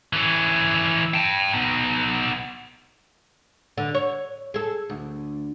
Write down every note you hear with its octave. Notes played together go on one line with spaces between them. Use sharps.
E3 C#4
G5 A5
B3 D#4
D3
C#5
G#4 A4
D2